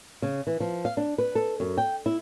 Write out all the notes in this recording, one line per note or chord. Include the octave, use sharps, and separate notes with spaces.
C#3
E3
F3
F5
D4
B4
A4
F#2
G5
E4